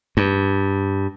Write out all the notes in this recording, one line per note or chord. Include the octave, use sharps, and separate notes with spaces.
G2